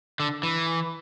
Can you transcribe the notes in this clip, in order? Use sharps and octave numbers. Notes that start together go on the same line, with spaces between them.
D3
E3